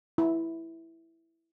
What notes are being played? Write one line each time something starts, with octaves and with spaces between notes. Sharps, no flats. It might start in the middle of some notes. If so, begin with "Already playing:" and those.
E4